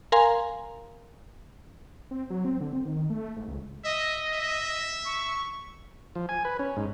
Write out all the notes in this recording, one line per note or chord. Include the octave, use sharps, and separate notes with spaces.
A#4 F5 G#5 A#5 C6
C4
F#3
C4
D3
C4
D#3
A3
G#2
C#2
D#5 E5
E5
C#6
F3
G#5
B4
C#4
G#2